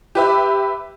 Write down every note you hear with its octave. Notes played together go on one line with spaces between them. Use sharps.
G4 B4 E5